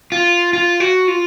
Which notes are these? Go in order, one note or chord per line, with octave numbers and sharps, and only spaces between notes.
F4
F4
F#4
F4